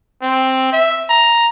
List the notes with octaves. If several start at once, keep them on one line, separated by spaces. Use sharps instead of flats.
C4
E5
A#5